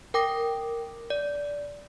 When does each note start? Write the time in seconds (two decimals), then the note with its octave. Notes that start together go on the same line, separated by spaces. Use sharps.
0.14 A#4 G5 D6 A#6
1.10 D5